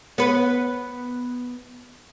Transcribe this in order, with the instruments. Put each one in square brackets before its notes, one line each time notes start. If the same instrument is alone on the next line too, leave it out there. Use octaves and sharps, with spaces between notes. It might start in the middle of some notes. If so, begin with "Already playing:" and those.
[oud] B3 B4